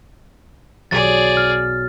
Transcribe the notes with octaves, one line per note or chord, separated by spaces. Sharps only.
B1 F#3 G#4 D5 A6
F6